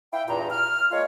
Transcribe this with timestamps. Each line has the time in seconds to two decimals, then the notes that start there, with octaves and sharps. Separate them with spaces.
0.13 E4 F5 G5
0.28 E2 G2 A#2 A#5
0.51 F6
0.91 G#3 A#3 F4 C#5 F5